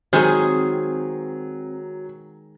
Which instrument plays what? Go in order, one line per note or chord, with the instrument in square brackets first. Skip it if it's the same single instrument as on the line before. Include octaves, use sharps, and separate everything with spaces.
[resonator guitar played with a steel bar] D#3 G#4 [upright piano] F#3 [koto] G#3 [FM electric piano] C4